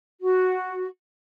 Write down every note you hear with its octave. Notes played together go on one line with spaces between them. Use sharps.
F#4